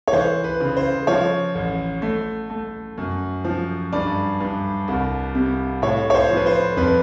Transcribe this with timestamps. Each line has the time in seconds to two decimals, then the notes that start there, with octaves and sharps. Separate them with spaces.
0.07 C#5
0.13 E3 C5
0.44 B4
0.60 C#3
0.77 C5
1.07 F3 C#5
1.55 A1
2.02 A3
2.50 A3
2.98 F#2
3.45 F3
3.93 G2 D5
4.40 G2
4.88 C2
5.35 C3
5.82 A2 C#5
6.10 C#5
6.14 C5
6.30 F3
6.37 B4
6.46 C5
6.77 F2 B4